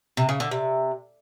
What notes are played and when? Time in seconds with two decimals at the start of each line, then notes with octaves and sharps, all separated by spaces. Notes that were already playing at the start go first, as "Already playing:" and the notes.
0.17 C3
0.29 C#3
0.40 D3
0.51 C3